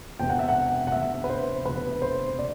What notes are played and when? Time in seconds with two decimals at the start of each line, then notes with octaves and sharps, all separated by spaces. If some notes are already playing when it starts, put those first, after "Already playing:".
0.19 E1 D2 C3 G5
0.30 F#5
0.39 E5
0.49 F#5
0.87 F#5
0.92 E1 D2 C3 E5
1.24 B4
1.30 C5
1.65 E1 D2 C3 B4
2.02 C5
2.39 C3 D5